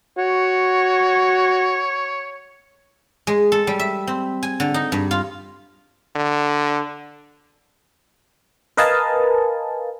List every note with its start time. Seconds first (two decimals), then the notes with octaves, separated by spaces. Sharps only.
0.18 F#4 C#5
3.27 G#3
3.52 A4
3.67 G3
3.79 E5
4.07 C4
4.43 G#5
4.60 D3
4.74 D#4
4.92 G2
5.11 F4
6.15 D3
8.77 A#4 B4 D#5 F5 G#5 A5